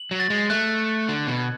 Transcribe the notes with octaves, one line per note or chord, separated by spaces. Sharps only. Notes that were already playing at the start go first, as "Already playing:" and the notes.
Already playing: F#7
F#3
A6
G#3
A3 F#6
C#7
D3 F#7
B2
G#6